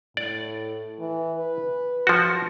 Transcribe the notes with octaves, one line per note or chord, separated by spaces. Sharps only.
A2 D5
E3
B4
F3 F#4